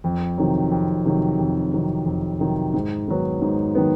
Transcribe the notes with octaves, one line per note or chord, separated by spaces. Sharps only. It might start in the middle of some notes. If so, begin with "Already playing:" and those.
F2
C3 D#3 F#3
F2
C3 D#3 F#3
F2
C3 D#3 F#3
F2
C3 D#3 F#3
G#2
D#3 F#3 B3
G#2
D#3 F#3 B3